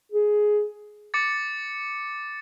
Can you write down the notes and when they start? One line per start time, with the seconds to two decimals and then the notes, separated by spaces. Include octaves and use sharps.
0.12 G#4
1.14 D6 A6 C#7